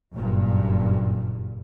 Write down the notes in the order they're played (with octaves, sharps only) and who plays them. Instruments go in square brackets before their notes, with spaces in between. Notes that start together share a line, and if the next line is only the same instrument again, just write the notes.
[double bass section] F#1 G2 A#2